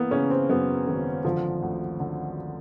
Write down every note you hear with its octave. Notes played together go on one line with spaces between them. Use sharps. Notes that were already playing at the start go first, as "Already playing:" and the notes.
Already playing: E3 A#3 B3
C#3 C#4
C4
F#2 B3
G#1
D3 F3
D2
D3